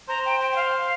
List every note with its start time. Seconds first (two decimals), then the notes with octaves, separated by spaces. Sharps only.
0.09 C5 A#5
0.26 G5
0.40 G5
0.52 G5
0.56 F5